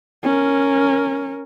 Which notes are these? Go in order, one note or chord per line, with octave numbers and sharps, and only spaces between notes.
C#4 A#4